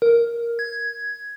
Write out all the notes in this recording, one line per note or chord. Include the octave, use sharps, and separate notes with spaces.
A#4
G#6